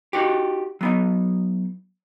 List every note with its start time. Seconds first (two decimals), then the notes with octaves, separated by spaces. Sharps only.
0.13 D#4 F#4 G4
0.81 F#3 B3 D#4